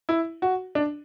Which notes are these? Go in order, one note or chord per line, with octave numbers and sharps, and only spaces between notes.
E4
F#4
D4